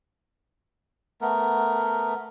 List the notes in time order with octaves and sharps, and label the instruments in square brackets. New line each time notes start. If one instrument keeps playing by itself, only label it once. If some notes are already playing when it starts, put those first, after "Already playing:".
[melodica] A3 B3 A#4